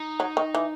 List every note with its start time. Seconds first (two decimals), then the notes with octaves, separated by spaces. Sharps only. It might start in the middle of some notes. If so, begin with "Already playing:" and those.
Already playing: D#4
0.20 F#3
0.37 D#3
0.55 E3